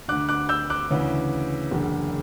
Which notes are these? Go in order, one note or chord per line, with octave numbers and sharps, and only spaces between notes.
D2 D3 D6 F#6
D6 F#6
E6 G6
D6 F#6
D2 C#3 E3
F#1 E2 D3